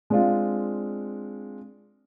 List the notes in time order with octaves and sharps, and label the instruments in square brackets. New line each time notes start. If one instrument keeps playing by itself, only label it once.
[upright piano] G#3 C4 D4 F4